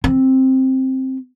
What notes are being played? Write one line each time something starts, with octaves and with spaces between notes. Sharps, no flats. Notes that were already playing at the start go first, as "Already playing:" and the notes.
C4